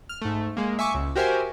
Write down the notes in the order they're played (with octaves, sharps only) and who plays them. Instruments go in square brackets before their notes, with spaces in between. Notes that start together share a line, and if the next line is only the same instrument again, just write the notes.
[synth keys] F6
G#2 A3
G#3 A#3
E5 G#5 C#6 D6
C#2
F#4 G4 A#4 C5 E5 G#5